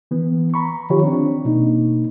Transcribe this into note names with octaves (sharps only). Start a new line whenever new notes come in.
E3 B3
A#5 B5 C#6
D#3 F3 F4 G4 C#5
C4 D4
B2 A#3 D#4